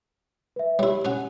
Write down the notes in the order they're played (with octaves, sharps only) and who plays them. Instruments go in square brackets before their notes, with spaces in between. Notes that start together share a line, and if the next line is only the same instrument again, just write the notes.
[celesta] B4 E5
[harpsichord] G3 E4 [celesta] G4 C#5
[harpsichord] C#4 F#4 [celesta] G#5